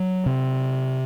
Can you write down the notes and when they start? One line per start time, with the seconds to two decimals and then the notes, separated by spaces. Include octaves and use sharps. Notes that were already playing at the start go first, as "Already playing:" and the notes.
Already playing: F#3
0.26 C3